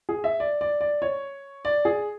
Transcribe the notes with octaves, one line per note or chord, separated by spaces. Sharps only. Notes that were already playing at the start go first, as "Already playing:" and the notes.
G#4
E5
D5
D5
D5
C#5
D5
G#4